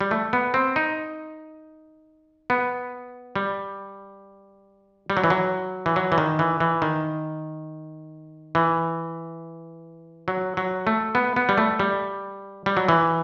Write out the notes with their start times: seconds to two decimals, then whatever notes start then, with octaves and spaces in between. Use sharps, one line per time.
0.01 G3
0.11 A3
0.33 B3
0.54 C4
0.76 D#4
2.50 B3
3.36 G3
5.10 G3
5.17 F#3
5.24 E3
5.30 F#3
5.86 E3
5.96 F#3
6.12 E3
6.18 D#3
6.39 E3
6.60 E3
6.82 D#3
8.55 E3
10.28 F#3
10.57 F#3
10.87 A3
11.15 B3
11.36 B3
11.49 G3
11.58 A3
11.79 G3
12.66 G3
12.77 F#3
12.88 E3